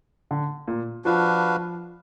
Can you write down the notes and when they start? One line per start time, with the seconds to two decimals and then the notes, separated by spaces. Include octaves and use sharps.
0.31 D3
0.68 A#2
1.05 F3 D4 F#4 B4 F5